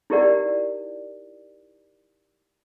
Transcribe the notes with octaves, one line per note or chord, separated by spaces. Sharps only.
D#4 E4 G4 A#4 D5 F#5